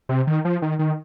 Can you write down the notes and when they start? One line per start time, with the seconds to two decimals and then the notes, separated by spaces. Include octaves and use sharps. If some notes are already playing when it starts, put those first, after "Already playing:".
0.09 C3
0.27 D#3
0.45 F3
0.62 D#3
0.79 D#3